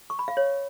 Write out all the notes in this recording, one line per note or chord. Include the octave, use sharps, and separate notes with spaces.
C#6
B5
F5
C#5